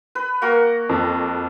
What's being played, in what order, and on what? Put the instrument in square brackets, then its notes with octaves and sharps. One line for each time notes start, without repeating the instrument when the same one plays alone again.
[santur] B4
A#3 F#4 A#4
[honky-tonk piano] F2